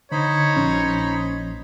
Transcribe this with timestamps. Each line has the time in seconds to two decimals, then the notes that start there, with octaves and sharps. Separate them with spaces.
0.12 D3 D#4 C5 C#5 B5
0.56 A#1 C#4